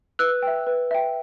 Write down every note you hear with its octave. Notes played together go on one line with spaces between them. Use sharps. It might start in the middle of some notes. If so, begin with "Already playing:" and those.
B4 E6 F#6
E5 G5
B4
E5 G5